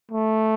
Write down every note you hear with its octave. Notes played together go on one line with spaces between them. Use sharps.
A3